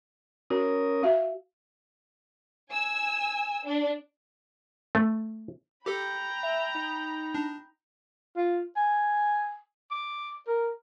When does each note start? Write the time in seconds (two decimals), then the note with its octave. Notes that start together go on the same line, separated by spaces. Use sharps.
0.50 C#4 F#4 A#4 D#6
1.03 F#4 E5 F5
2.70 G#5 E6
3.64 D4
4.95 A3
5.86 G4 A4 G5 A#5 B5
6.43 E5
6.75 D#4
7.34 D4
8.37 F4
8.76 G#5
9.91 D6
10.47 A#4